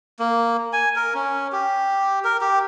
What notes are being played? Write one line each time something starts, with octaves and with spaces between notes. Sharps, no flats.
A#3
G#5
A#4
C#4
G4
A#4
G4